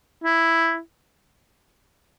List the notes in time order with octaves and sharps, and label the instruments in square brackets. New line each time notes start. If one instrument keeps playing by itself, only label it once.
[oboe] E4